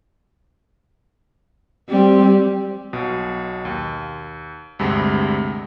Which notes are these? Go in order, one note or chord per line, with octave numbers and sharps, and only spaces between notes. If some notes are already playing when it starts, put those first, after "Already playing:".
G3 C4
B1 B2
D#2
D2 G2 C3 G#3